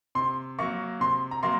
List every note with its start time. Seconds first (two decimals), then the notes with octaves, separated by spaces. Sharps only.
0.15 C3 C6
0.59 F#3 A#3 C#6
1.00 C3 C6
1.31 A#5
1.43 F#3 A#3 C6